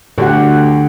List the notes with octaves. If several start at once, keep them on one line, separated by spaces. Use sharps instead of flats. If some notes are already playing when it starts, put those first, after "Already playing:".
D2 D3 G4 F#5